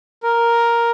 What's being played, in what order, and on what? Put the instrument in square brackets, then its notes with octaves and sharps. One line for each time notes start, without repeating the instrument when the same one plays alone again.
[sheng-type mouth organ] A#4